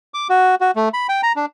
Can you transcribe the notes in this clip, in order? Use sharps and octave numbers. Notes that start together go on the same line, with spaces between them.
D6
F#4
F#4
A3
B5
G5
A#5
D4